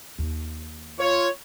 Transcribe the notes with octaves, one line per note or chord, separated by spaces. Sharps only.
D#2
F4 C#5